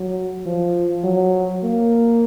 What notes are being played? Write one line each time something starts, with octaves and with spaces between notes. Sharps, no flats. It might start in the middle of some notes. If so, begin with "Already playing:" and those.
Already playing: F#3
F3
F#3
A#3